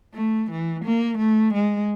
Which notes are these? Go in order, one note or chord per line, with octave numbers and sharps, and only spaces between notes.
A3
E3
A#3
A3
G#3